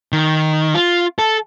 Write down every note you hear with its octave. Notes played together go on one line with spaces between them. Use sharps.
D#3
F4
A4